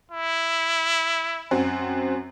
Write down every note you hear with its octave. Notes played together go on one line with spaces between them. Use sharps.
E4
F#2 C4 F#4